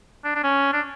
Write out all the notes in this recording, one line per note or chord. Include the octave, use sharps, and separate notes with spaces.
D4
D4
C#4
D4